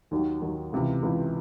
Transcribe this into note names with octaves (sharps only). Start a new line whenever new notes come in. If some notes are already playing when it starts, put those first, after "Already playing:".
D#2 D#3 F#3
D#2 D#3 F#3
C#2 C3 E3
C#2 C3 E3